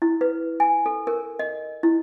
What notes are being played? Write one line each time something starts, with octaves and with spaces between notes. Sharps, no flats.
E4
B4
G#5
A4
A#4
D#5
E4